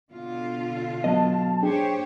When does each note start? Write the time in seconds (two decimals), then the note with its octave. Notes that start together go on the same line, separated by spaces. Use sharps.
0.11 B2 D3 F4
1.04 F#3 B3 D#5 A5
1.62 D4 G4 G#4 C5 C#5 G5